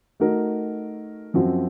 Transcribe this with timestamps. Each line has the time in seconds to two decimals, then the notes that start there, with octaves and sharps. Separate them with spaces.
0.20 A3 D#4 F#4 A#4
1.34 F#2 F3 C4 F#4